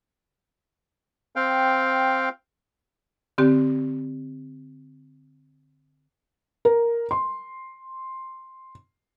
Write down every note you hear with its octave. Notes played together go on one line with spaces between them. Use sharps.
C4 F5 G5
D3 C4 G4
A#4
C6